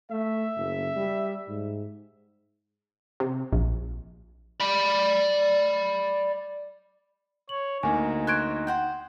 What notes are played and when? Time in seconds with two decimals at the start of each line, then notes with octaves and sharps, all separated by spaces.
0.11 A3 E5
0.56 F#1
0.96 G3
1.48 G#2
3.20 C3
3.52 A#1
4.60 D5 B5
7.49 C#5 F#7
7.83 D2 A#3 D#4 G#5
8.27 C5 C#5 F#6 G#6 D7
8.67 C5 F#5 G5